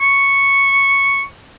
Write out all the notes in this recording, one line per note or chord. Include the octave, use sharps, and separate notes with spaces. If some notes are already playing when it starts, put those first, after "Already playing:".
C#6